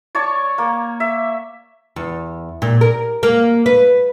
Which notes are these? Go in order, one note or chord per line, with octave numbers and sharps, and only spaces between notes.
C#5 D5 A5 C#6
A#3
E5
E2
A#2
A#4
A#3
B4